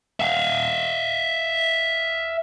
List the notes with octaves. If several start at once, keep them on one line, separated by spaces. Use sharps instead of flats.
E5 F5